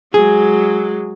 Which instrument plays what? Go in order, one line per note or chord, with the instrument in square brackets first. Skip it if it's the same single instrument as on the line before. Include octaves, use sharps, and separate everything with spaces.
[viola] F#3 G#3 [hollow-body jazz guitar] G#4